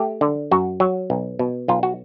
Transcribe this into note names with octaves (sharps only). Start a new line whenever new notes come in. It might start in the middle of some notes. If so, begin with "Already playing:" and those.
Already playing: A3 G4
D3
F#2 F#4
F#3
B1
B2
B1 F4
F#4